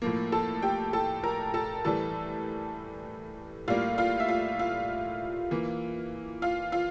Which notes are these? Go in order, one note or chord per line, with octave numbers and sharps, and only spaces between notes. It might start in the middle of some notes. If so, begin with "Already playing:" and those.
A2 F3 A#3
A4 A5
G4 G5
A4 A5
A#4 A#5
A4 A5
A2 E3 G3 A4 A5
A2 G3 A#3 F4 F5
F4 F5
E5
F4 F5
F4 F5
E3 A#3
F4 F5
F4 F5